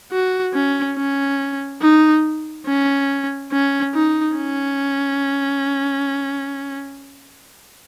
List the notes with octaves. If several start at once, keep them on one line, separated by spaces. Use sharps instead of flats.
F#4
C#4
C#4
D#4
C#4
C#4
D#4
C#4